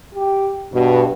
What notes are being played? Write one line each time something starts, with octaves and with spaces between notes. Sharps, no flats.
G4
G2 B2